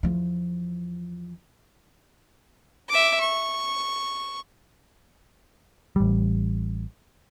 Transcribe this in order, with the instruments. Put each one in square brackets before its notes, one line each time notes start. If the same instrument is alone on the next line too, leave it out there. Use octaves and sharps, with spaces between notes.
[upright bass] E2 F3
[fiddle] E5 D6
C#6
[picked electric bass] A1 G3